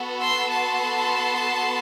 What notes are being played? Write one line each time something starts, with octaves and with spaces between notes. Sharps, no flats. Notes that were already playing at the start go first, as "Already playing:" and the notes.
Already playing: B3 F#4 A4
C6 E6
A5 C6